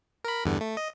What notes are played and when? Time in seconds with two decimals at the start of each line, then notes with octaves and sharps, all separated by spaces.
0.24 A#4 B5
0.45 E2 G2 D3
0.61 A3
0.77 D#5